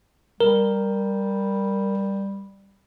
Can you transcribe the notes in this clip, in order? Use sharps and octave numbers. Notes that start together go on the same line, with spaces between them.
G3 A#4